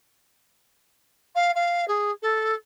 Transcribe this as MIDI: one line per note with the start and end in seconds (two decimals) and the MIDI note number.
1.35 1.51 77
1.55 1.87 77
1.88 2.11 68
2.22 2.54 69